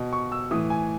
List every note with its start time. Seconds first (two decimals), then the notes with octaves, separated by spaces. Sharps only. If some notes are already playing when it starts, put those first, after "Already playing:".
Already playing: B2
0.13 C#6
0.32 E6
0.51 A2 E3 D#6
0.70 G#5